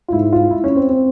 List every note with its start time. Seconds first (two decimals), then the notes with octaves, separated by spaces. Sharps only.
0.08 F4
0.13 G#2 E4
0.32 F4
0.51 E4
0.64 C#4
0.76 C4
0.89 C4